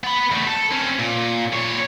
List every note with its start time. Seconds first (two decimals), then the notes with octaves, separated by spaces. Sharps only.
0.04 B3 B5
0.31 E2 A3
0.47 A4
0.71 C4 C#4
0.99 A#2
1.53 A#2 C#5